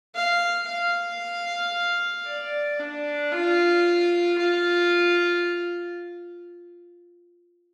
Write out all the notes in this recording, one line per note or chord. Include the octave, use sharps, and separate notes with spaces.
F5
F5
D5
D4
F4
F4